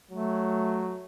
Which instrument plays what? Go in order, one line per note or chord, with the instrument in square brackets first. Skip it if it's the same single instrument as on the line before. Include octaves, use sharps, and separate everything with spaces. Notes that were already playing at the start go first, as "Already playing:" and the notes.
[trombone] F#3 [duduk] A3